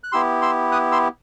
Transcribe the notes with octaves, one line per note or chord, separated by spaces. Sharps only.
F#6
B3 E4 G4 C6 E6
C6 E6
D#6 F#6
C6 E6